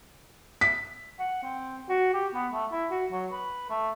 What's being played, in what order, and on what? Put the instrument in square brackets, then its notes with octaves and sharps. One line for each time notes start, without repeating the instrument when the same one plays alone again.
[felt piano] B6
[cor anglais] F#5
C4
F#4
G4
B3
A3
E4
F#4
F#3
B4
A3